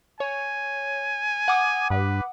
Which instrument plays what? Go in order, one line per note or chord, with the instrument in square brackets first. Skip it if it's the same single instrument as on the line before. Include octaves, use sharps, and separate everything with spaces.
[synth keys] C#5 [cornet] G#5
[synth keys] F#5 D6 D#6
[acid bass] G2 [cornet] B4